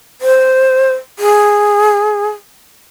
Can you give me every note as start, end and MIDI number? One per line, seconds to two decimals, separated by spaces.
0.22 0.91 72
1.19 2.27 68